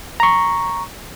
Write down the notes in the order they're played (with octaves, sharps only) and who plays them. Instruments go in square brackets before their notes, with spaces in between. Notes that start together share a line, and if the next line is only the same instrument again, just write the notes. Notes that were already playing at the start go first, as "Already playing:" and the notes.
[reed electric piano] A#5 C#6